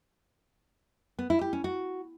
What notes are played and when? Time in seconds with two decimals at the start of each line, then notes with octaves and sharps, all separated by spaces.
1.19 B3
1.30 E4
1.41 G4
1.53 C#4
1.64 F#4